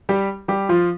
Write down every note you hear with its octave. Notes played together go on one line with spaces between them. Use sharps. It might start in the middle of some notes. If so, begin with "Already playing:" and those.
G3 G4
G3 G4
F3 F4